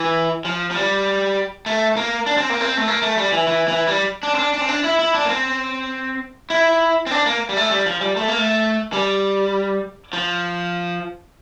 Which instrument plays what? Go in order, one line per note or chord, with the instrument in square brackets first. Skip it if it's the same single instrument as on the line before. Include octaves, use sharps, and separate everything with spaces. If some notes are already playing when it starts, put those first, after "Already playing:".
Already playing: [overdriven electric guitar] E3
F3
F3
G3
A3
A#3
D4
C4
A#3
C4
A3
A#3
A3
G3
E3
E3
E3
G3
D4
C4
D4
D4
C4
D4
E4
E4
D4
A#3
C4
E4
C4
D4
A#3
G3
A3
G3
F3
G3
A3
A#3
A3
G3
F3